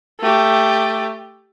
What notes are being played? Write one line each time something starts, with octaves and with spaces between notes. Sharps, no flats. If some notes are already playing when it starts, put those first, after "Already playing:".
A3 G4